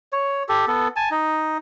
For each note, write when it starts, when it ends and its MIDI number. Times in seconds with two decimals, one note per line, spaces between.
0.12 0.43 73
0.49 0.66 67
0.49 0.66 69
0.67 0.88 59
0.67 0.88 69
0.96 1.09 80
0.96 1.09 81
1.11 1.58 63